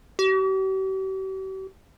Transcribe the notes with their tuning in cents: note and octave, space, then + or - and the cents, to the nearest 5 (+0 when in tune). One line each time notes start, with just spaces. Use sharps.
G4 -45